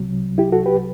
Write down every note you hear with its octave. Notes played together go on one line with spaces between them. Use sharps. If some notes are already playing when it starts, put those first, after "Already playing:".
Already playing: C2 C3 F#3
E4 G4
F#4 A4
G4 B4